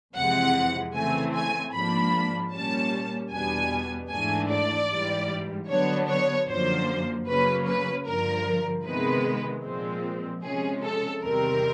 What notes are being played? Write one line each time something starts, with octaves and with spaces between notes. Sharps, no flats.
F2 C3 E3 G#3 F#5
C#3 E3 A3 C4 G#5
G#5
G#2 F3 A#3 D4 B5
A#2 G3 A#3 C#4 A5
E2 B2 G3 B3 D4 G#5
G#2 E3 A3 D4 G#5
D5
G#2 E3 G3
D3 F#3 B3 D4 C#5
C#5
F#2 D3 F3 A#3 C5
C#3 F#3 A#3 C#4 B4
B4
G2 D3 F3 A#4
C3 D#3 G#3 B3 B4
A#2 F3 G#3 C4
C3 F3 G#3 C#4 G#4
A4
E2 C3 D#3 G3 C4 A#4